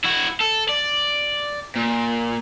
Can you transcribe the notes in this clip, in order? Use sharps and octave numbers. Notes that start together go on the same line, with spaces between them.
E4 F#4
A4
D5
A#2